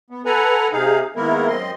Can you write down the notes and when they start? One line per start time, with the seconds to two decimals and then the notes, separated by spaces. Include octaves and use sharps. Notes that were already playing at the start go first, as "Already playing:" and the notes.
0.10 B3
0.25 A4 B4 F#5 G#5 A#5
0.73 C3 D#4 G#4 F5
1.16 D#3 G#3 A#3 B3 E4 A#4
1.48 F#2 C4 D#5 C6